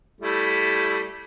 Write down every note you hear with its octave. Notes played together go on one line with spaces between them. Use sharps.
G3 A3 E4